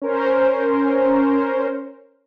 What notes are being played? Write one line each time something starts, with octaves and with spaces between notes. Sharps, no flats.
C#4 A#4 C5